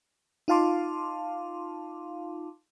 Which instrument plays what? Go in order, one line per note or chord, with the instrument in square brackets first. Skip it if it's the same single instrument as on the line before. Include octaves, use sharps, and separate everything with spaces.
[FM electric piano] D#4 F4 F5 A5 C6 D6